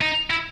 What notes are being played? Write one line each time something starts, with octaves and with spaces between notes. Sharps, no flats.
D#4
E4